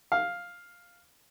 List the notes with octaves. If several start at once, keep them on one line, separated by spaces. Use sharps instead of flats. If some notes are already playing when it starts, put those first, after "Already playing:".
F5